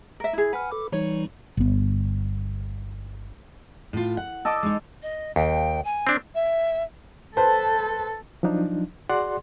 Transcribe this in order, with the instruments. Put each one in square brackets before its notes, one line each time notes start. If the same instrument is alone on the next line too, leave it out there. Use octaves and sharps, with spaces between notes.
[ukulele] A#4 E5
E4 G#4
[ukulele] B4 [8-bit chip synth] F#5 G#5 F6
[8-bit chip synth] A4 D6
[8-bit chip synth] E3 G3 D#4 [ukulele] C#5
[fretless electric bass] G1 B3
[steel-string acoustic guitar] A2 F4
F#5
[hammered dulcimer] A4 D#5 D6
[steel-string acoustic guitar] G#3 D#4
[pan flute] D#5
[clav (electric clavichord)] D#2 [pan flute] G5
[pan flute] G#5
[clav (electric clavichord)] C4 D4
[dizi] E5
[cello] A4 [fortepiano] B4 C5 [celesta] A5
[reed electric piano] F3 F#3 D4 D#4
F#4 G#4 D5 F#5 C6